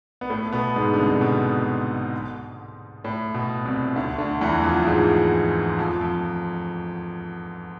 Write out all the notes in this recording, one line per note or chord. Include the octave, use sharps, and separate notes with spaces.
B3
A2 A3
B2 B3
G#2 G#3
D3
C2 C3
B2
A2
B2
C2 C3
D2 D3
D2 D3
E2 E3
F2 F3
F3
G#2 G#3
F2 F3
F2 F3